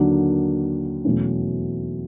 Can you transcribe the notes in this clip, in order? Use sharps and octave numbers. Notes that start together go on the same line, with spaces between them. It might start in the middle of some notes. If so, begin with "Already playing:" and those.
Already playing: D#2 D3 F#3 A#3 D4
E2 B2 F#3 A3 C#4